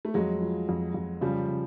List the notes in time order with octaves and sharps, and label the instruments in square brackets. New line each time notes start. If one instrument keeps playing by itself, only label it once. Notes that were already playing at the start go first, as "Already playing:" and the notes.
[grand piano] A3
[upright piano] F2 [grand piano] F#3 G#3
[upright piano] F3
F2
F2
[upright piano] C#3 [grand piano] F3 G3
[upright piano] C#3